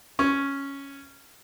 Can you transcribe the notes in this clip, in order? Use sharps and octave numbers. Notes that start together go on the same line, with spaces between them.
C#4